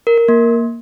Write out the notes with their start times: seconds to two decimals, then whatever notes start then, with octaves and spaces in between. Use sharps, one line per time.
0.07 A#4
0.18 A#4
0.28 A#3